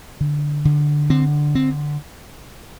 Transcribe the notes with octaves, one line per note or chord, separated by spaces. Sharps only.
D3
D3
D3 C4
D3 C4